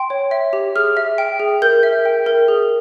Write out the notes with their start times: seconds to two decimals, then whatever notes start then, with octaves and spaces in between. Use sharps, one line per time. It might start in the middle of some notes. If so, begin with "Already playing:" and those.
Already playing: G5 C6
0.10 C#5
0.31 E5
0.53 G4
0.76 G#4 F6
0.97 E5
1.18 G5
1.40 G#4
1.62 A#4 G6
1.83 E5
2.06 G5
2.26 A#4
2.48 G#4